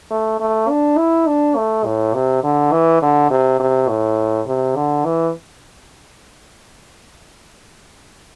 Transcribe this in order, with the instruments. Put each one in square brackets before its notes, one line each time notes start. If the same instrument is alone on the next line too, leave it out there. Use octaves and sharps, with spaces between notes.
[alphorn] A3
A3
D4
E4
D4
A3
A2
C3
D3
E3
D3
C3
C3
A2
C3
D3
E3